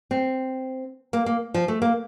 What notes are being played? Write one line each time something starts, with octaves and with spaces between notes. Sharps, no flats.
C4
A#3
A#3
F3
A3
A#3